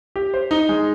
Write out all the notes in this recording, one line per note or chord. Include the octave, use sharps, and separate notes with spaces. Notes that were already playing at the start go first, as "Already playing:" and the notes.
G4
C5
D#4
G#3